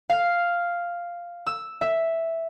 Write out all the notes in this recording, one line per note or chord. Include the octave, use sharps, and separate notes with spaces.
F5
E6
E5